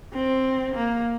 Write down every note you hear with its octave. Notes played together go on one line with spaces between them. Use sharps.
C4
A#3